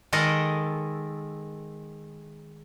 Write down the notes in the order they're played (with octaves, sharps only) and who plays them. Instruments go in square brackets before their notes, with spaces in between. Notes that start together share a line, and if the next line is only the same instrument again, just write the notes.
[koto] D#3 G#3 A4 A#4 D#5